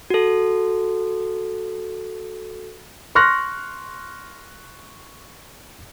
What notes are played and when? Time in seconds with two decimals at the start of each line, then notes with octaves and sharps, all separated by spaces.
0.10 F#4 A4
3.15 C6 C#6 F6 F#6 A#6